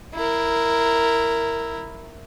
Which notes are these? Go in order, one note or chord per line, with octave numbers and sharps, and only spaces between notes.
E4 A#4